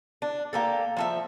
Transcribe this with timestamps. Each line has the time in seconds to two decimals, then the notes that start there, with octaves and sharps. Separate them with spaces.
0.22 D4
0.53 A#3 G4 A4
0.97 F3 A4 E5